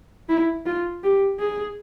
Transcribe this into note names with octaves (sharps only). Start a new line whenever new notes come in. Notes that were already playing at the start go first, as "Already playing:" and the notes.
E4
F4
G4
G#4